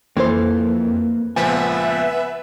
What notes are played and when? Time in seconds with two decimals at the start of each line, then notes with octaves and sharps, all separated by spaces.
0.17 F2 E3 A#3 A4 C5
1.36 C#2 A#2 F3 B3 B4 E5 F#5 G#5